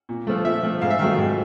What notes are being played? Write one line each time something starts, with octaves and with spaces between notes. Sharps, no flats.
A#2
F3 A3
A#2 E5
F3 A3
G#2 F5
E5
D#3 F#3 A3 F5
G#2